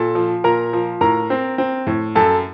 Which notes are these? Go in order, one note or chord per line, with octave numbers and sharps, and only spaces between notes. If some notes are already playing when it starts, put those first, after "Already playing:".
Already playing: A#2 A4 A5
F3
A#2 A#4 A#5
F3
A2 A#4 A#5
C4
C4
A2
F#2 A4 A5